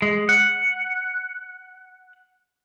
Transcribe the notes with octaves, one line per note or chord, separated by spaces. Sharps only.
G#3
F#5